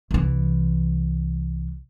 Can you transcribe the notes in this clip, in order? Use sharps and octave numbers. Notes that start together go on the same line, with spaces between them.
C2 E3